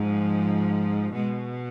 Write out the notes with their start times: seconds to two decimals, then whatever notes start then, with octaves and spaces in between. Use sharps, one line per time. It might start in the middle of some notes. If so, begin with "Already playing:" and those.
Already playing: G#2 F3
1.14 B2 G#3